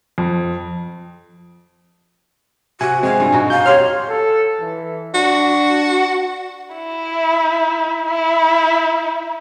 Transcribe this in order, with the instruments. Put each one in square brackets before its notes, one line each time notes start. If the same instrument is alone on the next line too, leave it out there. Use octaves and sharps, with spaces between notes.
[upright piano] F2
[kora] C3 [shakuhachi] F#4 [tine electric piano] G#5
[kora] G#3 F5 [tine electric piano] C4 [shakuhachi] G#5
[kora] G2 G3 F4
B2 D#4 F#4
[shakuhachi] F5 [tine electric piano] G6
[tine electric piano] G4 C6 F6 [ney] C#5
[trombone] A4
E3
[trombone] D4 [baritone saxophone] F#4
[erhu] E4
E4